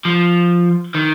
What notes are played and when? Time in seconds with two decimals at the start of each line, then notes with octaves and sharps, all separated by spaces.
0.05 F3
0.94 D#3